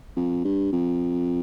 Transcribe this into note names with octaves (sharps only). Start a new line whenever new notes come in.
F2
G2
F2